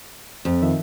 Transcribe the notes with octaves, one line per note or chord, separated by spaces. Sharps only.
F2
D#3 F3 E5